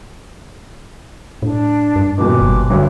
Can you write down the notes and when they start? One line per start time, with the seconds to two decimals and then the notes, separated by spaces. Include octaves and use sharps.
1.42 A2 D4
1.96 G2
2.18 D#1 B2 D6
2.41 G1
2.70 D2 G2 C#5